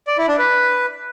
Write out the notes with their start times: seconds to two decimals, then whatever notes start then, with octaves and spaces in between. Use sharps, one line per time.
0.07 D5
0.18 E4
0.28 D4
0.38 B4